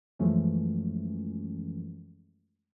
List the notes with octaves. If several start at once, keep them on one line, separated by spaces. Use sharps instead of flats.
F#2 E3 F3 G#3 A3 C#4